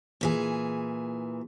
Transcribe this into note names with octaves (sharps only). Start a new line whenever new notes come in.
A#2 E3 G#4